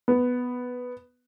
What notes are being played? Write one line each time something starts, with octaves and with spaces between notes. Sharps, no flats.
B3